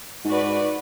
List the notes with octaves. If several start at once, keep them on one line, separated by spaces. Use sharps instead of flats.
G#2 F#4 B4 D5